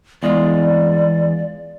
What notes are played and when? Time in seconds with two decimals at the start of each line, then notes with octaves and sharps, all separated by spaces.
0.23 E2 G#3 F4 D5